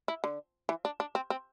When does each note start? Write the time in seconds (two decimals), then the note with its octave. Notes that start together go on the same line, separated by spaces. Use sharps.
0.08 E4
0.24 D3
0.69 E3
0.85 D4
1.00 D4
1.15 C4
1.30 C4